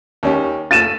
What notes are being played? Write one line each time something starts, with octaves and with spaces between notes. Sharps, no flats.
D#2 C#4 G4
A3 F4 A6 D#7 E7